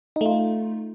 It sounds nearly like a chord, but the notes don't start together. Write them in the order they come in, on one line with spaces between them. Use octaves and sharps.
D#4 A3 F4